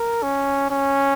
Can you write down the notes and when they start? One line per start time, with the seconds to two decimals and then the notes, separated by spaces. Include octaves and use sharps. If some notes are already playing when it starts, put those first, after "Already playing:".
Already playing: A#4
0.23 C#4
0.70 C#4